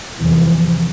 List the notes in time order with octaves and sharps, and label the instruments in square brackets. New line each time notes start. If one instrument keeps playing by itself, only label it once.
[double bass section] E2 C3 E3 F3